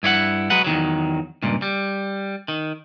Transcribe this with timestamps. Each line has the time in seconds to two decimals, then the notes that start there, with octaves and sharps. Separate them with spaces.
0.03 G2 E4 C#5 F#5
0.50 F#3 G#3 B4 F#5
0.64 E2 D#3 F#3
1.43 C#2 G2 A#2
1.62 G3
2.48 D#3